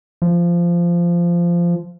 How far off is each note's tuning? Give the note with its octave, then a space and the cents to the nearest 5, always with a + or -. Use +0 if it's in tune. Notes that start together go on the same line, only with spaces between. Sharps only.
F3 -15